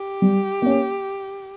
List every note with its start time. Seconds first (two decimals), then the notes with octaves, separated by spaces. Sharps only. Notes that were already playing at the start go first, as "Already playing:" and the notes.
Already playing: G4
0.22 G3
0.62 A#3 C#4